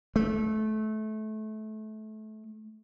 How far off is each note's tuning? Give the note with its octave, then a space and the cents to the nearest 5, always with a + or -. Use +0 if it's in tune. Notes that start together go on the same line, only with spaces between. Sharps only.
A3 -25